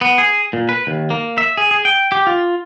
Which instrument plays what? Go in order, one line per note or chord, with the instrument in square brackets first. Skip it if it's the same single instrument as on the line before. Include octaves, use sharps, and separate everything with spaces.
[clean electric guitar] B3
G#4
A#2
B4
D#2
A#3
E5
G#4
G#4
G5
G4
F4